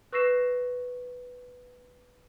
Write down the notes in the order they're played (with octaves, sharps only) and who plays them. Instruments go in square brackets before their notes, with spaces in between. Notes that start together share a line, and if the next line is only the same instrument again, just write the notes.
[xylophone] B4 C#6 E6 A#6 C7 E7